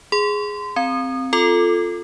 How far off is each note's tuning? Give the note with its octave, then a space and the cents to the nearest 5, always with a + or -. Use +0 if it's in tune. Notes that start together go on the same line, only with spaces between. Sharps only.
G#4 +0 C6 -30
C4 +0 A#5 +0
F4 +0 A4 +0 D6 +25